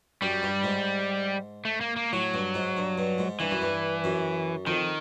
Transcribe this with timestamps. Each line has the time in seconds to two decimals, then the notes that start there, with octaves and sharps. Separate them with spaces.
0.22 F#2 G3
0.43 G2
0.64 G#2
1.65 A3
1.81 A#3
1.96 A#3
2.13 A2 F#3
2.34 G2
2.54 G#2
2.77 G2
2.98 G2
3.18 G#2
3.40 G2 E3
3.51 F#2
3.62 G2
4.04 F#2
4.67 F2 D#3